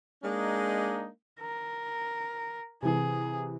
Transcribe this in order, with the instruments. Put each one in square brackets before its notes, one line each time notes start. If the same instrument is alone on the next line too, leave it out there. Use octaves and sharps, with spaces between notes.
[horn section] G#3 A#3 D4 D#4 G#4
[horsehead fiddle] A#4
[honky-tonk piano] C3 E3 [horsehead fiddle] G#4